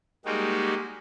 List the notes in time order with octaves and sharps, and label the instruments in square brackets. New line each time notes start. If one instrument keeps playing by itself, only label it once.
[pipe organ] G3 G#3 A#3 D#4 F#4 G4